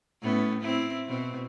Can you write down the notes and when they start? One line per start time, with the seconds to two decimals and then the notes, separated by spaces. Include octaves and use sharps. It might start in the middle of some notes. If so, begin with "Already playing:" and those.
0.22 A2 B3 C#4
0.61 C4 E4
1.07 B2 C4